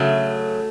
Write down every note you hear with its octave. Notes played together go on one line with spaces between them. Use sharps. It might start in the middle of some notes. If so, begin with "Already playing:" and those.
Already playing: C#3 F#3 A3